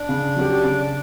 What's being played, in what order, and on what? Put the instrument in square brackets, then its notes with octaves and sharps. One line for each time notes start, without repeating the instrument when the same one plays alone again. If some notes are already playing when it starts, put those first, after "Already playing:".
Already playing: [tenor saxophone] D4
[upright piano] C#3
F#3 C#4 G4
C#3